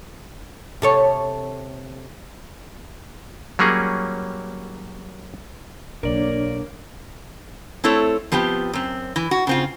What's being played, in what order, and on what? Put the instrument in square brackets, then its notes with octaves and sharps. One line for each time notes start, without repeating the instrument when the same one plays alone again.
[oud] C3 A4 C#5
[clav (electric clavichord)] F#3 G3 A#3 C#4 G#4
[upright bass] B1 [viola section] A#3 [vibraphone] D4 C#5 [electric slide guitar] A#4 D5
[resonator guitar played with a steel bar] A3 C4 E4 A4 C#5
F3 B3 C4 G4
F#2 C4
E3
F#4
C#3 C4 F4